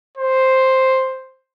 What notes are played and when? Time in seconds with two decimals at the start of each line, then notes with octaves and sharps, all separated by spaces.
0.17 C5